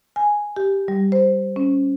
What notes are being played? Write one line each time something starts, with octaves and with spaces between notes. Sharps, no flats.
G#5
G4
G3
C5
C#4